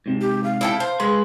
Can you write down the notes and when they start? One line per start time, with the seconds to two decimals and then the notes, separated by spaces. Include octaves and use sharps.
0.06 G#2 C3
0.21 G4
0.44 F5
0.61 E4 A4 G5
0.80 C5
1.00 G#3 G#4 B4 C6